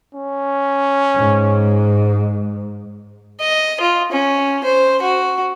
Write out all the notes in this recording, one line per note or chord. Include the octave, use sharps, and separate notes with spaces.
C#4
G#2
D#5
F4
C#4
C5
F#4